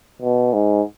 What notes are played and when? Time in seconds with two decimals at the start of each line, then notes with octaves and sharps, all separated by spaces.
0.22 B2
0.53 G#2